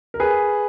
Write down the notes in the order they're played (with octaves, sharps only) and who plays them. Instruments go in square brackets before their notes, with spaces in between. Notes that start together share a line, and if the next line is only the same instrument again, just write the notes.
[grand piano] A#4
G#4 B4